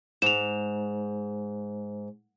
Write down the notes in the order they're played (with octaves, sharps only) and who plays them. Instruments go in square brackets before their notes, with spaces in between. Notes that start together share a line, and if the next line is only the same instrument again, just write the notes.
[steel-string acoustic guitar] G#2 [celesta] E7 F7